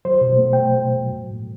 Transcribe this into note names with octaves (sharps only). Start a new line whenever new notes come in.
F#3 C5
B2
A3
B2 G5
F#3
B2
F#3
A2
A3